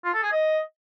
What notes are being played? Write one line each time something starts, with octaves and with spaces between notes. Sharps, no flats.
F4
A4
G#4
D#5